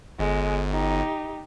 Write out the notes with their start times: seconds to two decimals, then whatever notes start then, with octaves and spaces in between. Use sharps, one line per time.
0.19 G1 G#3
0.71 D#4 G4